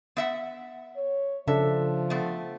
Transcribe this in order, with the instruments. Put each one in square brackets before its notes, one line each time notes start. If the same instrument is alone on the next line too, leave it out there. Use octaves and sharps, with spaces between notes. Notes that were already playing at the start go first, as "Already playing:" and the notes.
[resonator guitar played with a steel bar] B3 E5 F#5
[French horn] C#5
[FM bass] C#3 [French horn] F3 [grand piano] D4 A4 [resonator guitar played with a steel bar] E5
[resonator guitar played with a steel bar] A3 B3